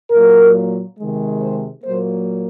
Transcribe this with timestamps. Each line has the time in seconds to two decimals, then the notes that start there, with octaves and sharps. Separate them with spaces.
0.11 A#2 F#3 A#3 A#4
0.98 C3 D#3 G#3
1.42 C5
1.84 A#2 F#3 A#3 C5